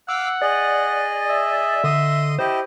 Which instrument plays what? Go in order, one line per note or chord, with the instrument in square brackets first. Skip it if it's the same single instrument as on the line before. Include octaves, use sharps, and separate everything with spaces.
[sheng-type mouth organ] F5 D6 [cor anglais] F#5 [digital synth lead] E6
[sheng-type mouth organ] G#4 D#5 [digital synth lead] D5
[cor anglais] E5
[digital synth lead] D3 [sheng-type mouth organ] D#5 C6 D#6
[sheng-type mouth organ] E4 G4 D#5 [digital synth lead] C5